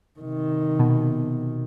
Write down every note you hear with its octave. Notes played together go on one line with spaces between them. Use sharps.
C3 D#3
B2